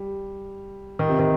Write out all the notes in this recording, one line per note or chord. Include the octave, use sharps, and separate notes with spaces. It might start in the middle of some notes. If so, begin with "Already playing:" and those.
Already playing: G3
D#3
C3
D#3